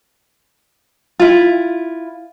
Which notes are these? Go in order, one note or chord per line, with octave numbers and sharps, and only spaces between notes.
E4 F4